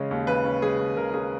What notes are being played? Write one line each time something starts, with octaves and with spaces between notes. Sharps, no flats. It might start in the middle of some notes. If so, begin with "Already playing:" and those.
Already playing: C#3 G#3 C#4
D#2
C#3 B4
C#4
G#3 G#4
D#2
C#3 A#4
C#4 G#4